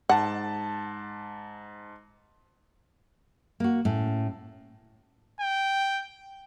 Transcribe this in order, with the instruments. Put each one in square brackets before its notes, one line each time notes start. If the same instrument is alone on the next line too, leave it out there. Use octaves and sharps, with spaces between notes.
[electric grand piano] G#2 A5 [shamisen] F#5
[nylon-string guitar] A#3 F#4
A2 C#4
[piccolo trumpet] G5